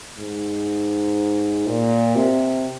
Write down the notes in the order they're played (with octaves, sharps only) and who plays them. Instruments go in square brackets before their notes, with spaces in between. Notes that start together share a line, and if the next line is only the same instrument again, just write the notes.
[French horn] G#2
A#2
C3